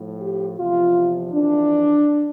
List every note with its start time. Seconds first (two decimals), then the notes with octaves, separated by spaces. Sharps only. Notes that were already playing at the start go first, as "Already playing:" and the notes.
Already playing: A2 F3
0.21 G4
0.58 E2 C3 F3 F4
1.32 F2 E3 D4